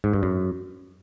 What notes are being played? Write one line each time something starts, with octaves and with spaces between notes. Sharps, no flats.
G#2
G2
F#2